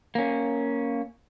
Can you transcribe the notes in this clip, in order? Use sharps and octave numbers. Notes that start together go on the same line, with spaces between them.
A#3 C#4